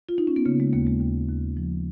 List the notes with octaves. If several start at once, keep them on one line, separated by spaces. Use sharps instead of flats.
F4
D#4
C#4
B3
C#3 A#3
G#3
D#2 A#3
G#3
D#2
D#2
F3